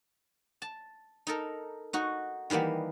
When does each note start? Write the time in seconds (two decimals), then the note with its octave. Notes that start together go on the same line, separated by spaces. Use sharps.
0.62 A5
1.27 D#4 A4 A#4
1.93 D#4 F#4
2.50 D#3 E3 G3 A#3 B3